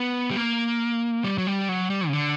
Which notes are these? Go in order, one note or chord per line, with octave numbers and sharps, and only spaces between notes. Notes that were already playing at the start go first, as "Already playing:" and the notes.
Already playing: B3
G3
A#3
G3
F#3
G3
F#3
G3
C#3
D3